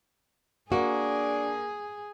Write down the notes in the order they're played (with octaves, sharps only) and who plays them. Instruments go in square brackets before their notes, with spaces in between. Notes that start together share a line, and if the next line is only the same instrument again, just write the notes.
[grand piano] A#3 [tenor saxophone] D4 [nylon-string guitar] F#4 [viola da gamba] G#4